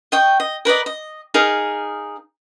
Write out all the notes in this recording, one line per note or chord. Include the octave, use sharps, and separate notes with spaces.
D#5 G5 C#6
D#5
A#4 B4 D5 D#5
D#5
D#4 G#4 A#4 F5